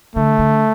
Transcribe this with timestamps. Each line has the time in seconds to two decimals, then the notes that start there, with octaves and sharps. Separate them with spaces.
0.16 D3 A3
0.39 D3